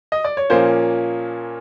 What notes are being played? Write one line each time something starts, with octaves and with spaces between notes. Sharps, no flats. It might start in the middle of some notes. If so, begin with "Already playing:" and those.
D#5
D5
C#5
A#2 F3 A#3 C#4 C5